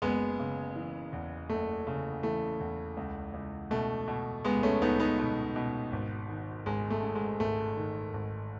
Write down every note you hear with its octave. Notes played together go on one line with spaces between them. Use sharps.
F#1 G#3 B3
C#3
E3
E2
F#1 A3
C#3
E3 A3
E2
C#2
C#2
B2 A3
B2
C#2 G#3 B3
A3 C#4
C#2 B3 D#4
B3 D#4
B2
B2
G#1
D#3
G#1 G#3
A3
G#2
G#3
G#1 A3
D#3
G#1